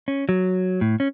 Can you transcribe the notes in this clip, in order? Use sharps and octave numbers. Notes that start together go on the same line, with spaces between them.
C#4
F#3
A2
C#4